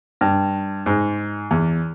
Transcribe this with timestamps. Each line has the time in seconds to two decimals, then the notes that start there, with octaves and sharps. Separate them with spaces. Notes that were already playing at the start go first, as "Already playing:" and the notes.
0.21 G2
0.86 G#2
1.51 E2